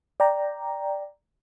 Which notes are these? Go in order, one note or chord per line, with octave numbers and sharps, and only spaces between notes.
D5 G5 A#5